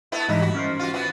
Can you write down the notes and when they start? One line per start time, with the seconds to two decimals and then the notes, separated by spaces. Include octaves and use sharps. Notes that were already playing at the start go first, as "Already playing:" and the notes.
0.12 A3 B3 E4
0.28 G#2 E3 G3 D#4 E4
0.42 F#4
0.55 C#4 A#4 C5
0.79 F4 F#4
0.93 E3 B3 F#4